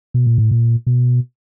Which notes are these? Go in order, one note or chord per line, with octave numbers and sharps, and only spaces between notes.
B2
A#2
A2
A#2
B2